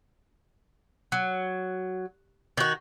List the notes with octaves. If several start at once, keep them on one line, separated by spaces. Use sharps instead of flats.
F#3
D#3 F#4